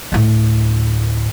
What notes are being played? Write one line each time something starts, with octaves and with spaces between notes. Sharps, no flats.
D2 A2